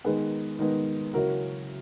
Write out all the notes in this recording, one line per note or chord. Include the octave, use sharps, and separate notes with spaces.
D#3 G#3 B3 D#4 G#4 B4
D#3 G#3 B3 D#4
C#3 F#3 C#4 E4 F#4 A#4